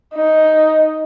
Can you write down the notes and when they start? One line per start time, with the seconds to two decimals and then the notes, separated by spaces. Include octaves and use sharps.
0.14 D#4